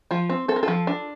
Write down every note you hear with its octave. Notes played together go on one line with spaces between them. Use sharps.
F3 F4
C4
C4 A4
A#4
F3 F4 A4
D4